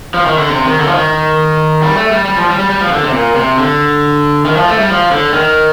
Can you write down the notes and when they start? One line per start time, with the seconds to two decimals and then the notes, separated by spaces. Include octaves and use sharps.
0.14 F3
0.26 D#3
0.38 D3
0.50 C3
0.65 D#3
0.80 D3
0.87 F3
0.94 D#3
1.82 G3
1.97 A3
2.11 G3
2.25 G3
2.37 F3
2.48 G3
2.59 G3
2.70 G3
2.81 F3
2.92 D3
3.03 C3
3.13 A#2
3.35 C3
3.57 D3
4.45 D#3
4.57 F3
4.68 A3
4.79 G3
4.90 F3
5.11 D3
5.33 D#3